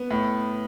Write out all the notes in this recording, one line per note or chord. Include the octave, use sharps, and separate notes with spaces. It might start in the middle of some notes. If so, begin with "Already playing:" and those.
Already playing: B3
A2